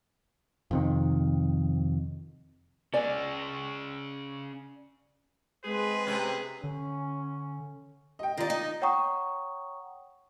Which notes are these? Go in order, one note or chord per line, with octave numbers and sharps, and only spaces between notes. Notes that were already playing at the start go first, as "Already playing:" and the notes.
F2 C3 D#3
C#4 G#4 D5 D#5 G#5
G#3 C4 G#4 B4
C3 C#4
D3 C#4
D#5 G5
D#3 F4 D5 D#5 A#5
D#4
C#5 F#5 G5 A#5 C#6 D#6